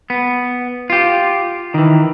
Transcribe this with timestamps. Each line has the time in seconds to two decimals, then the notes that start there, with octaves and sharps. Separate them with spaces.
0.10 B3
0.90 F4 G4
1.74 D#3 E3